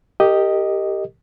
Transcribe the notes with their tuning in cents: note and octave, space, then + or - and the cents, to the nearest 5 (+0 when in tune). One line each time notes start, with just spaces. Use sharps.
G4 +0 A#4 -40 D#5 +0